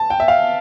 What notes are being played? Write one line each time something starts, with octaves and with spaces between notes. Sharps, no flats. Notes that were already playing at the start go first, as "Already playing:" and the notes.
Already playing: A5
G5
E5
F5